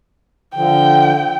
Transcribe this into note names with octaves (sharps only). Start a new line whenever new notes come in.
D3 F3 G5